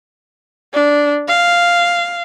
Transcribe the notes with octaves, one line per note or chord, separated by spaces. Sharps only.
D4
F5